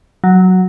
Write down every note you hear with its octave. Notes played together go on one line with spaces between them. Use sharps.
F#3